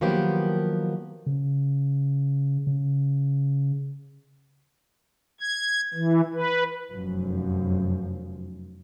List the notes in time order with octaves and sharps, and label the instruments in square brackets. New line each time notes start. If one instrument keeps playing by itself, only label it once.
[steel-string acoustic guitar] D#3 F3 F#3 A#3 B3 G4
[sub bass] C#3
C#3
[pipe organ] G#6
E3
B4
[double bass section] F1 F#2 F3